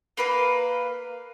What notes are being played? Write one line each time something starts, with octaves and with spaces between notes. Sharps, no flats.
A#3 B4 F5